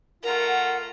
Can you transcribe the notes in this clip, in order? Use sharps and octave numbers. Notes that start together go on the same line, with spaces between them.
A3 F4 A#4 F#5 A#5